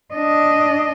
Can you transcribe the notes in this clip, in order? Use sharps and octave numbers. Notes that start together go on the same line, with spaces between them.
D4 D#5